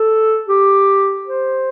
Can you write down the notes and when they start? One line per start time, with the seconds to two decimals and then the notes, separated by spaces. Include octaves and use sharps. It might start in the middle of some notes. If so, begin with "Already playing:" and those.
Already playing: A4
0.48 G4
1.27 C5